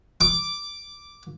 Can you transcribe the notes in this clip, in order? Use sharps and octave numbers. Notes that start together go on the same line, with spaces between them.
D6